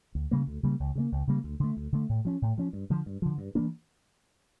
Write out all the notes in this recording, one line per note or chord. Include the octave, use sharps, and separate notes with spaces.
D2
C#3 G3 A#3
D2
C#3 G3 A#3
C#2
C#3 G3 A#3
C#2
C#3 G3 A#3
D2
D3 A3
D2
D3 A3
A2
F3 C#4
A2
F3 C#4
G2
D3 F3
G2
D3 F3
G2
E3 A#3 D4